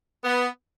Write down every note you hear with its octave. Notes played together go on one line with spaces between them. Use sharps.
B3